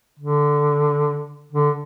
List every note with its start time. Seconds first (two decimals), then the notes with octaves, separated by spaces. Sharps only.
0.19 D3
1.52 D3